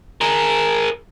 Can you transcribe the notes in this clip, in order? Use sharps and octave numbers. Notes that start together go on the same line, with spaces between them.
G#4 A#4